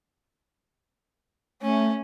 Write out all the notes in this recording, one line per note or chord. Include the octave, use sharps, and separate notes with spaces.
A3 C#4